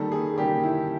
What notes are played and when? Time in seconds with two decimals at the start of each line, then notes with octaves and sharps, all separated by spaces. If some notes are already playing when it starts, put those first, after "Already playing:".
Already playing: D#3 G3 A#3 A4
0.12 G#4
0.38 D#3 G3 A#3 G4
0.63 E4